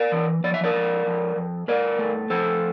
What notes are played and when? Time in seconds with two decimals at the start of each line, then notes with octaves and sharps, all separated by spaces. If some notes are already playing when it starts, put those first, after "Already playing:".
Already playing: A#4 D5
0.12 E3
0.44 F3 D5
0.54 E5
0.64 A#4 D5
0.74 F2
1.06 F2
1.36 F2
1.68 G2 A#4 D5
1.99 A3
2.30 F3 A4 C5